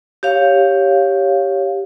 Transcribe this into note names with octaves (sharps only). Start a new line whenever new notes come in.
G4 C#5 F5